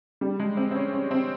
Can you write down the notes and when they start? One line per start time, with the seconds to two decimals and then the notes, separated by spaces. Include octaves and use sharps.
0.21 G3
0.39 G#3
0.57 C4
0.71 C4
0.75 C#4
0.93 C#4
1.11 C4